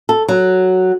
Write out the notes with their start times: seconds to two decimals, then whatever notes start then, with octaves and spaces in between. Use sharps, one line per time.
0.09 A4
0.28 F#3